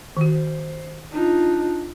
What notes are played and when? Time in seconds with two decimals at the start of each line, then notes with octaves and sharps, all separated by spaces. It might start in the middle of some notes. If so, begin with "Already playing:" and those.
0.17 D#3 F#4 C5
1.13 D4 D#4 F4